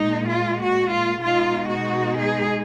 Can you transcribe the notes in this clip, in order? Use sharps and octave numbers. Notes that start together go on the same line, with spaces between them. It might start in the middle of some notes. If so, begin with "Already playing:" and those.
Already playing: A#2 G#3 D#4
F4
F#4
F4
B2 G#3 D#4 F4
F#4
G#4